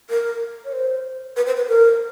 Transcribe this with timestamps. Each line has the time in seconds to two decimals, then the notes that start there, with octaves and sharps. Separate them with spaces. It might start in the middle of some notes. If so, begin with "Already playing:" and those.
0.10 A#4
0.65 C#5
0.72 C5
1.36 B4
1.47 C5
1.57 B4
1.69 A#4